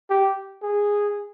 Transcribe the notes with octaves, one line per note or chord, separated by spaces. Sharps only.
G4
G#4